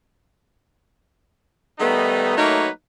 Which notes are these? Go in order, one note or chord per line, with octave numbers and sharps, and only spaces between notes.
D#3 G3 A3 B3 D#4
F#3 A3 A#3 D#4 B4 C#5